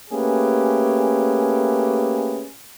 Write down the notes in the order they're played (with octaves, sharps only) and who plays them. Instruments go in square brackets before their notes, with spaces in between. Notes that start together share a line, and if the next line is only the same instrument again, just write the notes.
[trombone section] A3 A#3 C#4 G4 G#4 B4